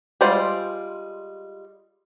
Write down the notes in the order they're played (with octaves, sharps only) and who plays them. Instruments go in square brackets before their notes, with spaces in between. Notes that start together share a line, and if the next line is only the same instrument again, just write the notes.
[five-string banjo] G3 G#3 F4 C5 D5